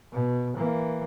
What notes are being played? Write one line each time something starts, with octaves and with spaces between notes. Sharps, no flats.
B2
E3 A#3